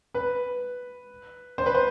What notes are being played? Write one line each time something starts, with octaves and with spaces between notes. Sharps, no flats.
B4
C5
B4
C5